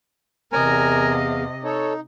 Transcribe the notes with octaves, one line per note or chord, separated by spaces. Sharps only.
E2 C3 A#4 D#5 G#5 A#5
F5
D#4 A4 C#5